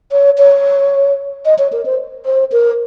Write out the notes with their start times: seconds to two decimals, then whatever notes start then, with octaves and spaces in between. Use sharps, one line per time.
0.12 C#5
0.38 C#5
1.45 D#5
1.58 C#5
1.72 A#4
1.86 C5
2.26 C5
2.52 A#4